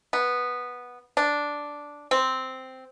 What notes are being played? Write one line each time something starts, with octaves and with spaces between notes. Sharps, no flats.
B3
D4
C4